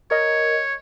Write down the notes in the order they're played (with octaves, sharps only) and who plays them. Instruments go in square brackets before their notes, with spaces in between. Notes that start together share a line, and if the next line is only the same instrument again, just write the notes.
[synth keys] A#4 D#5 [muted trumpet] C#5